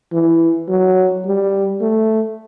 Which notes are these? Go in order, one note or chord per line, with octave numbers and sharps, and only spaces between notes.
E3
F#3
G3
A3